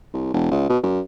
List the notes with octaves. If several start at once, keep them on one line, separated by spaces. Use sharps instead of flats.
C2
E1
C#2
B2
F#2